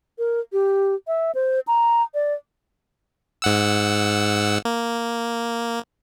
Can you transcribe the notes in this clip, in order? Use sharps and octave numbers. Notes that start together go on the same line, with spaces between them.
A#4
G4
E5
C5
A#5
D5
G#2 F#5 E6
A#3